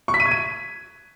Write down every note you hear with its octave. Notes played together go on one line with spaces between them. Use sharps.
C#6
B6
D#7
G#6
D#7